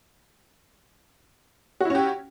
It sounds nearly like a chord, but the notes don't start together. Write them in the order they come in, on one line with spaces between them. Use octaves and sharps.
F#4 E4 C#4 G4